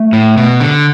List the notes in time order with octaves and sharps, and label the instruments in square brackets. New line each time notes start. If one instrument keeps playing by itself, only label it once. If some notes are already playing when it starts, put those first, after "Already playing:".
Already playing: [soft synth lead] A3
[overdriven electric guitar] A2
B2
D3